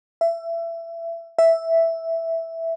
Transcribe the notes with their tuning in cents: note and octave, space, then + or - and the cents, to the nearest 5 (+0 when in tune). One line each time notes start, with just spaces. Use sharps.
E5 +25
E5 +0